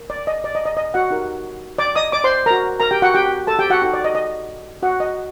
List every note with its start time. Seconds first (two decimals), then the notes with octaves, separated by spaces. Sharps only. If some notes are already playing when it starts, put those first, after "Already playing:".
Already playing: A#4
0.10 D5
0.27 D#5
0.44 D5
0.55 D#5
0.65 D#5
0.77 D#5
0.94 F#4 F#5
1.11 D#4 G4 A#4
1.78 D5 D6
1.95 D#5 D#6
2.12 D5 D6
2.24 C5 C6
2.46 A#4 A#5
2.51 F#4
2.80 A#4 A#5
2.91 G4 G5
3.02 F#4 F#5
3.14 G4 G5
3.47 A4 A5
3.59 G4 G5
3.70 F#4 F#5
3.82 D#4 F#4 A4
3.93 D5
4.04 D#5
4.15 D#5
4.83 F#4 F#5
5.00 D#5